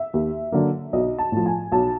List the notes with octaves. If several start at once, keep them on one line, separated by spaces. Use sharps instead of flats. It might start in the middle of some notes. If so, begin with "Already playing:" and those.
Already playing: E5
D#2
D3 F#3 A#3
B1 D#5
A5
A2 F3
G#5
B1 A5